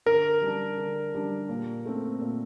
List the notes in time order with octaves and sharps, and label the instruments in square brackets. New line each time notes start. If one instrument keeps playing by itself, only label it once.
[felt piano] D3 [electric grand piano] A#4
[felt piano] G3 D4
D3
G3 D4
A#2
A3 C4
A#2